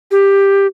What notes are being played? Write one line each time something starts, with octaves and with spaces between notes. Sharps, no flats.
G4